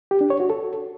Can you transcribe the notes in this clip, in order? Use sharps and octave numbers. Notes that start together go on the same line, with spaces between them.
G4
D4
C#5
F#4
A4